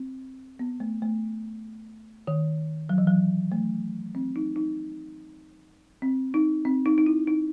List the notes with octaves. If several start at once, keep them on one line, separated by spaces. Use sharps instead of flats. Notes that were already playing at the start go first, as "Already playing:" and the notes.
Already playing: C4
B3
A3
A3
D#3
F#3
E3
F#3
A3
C4
D#4
D#4
C4
D#4
C4
D#4
D#4
E4
D#4